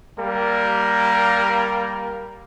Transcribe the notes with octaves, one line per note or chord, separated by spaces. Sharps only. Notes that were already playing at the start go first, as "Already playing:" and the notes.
G3 A#3 A#4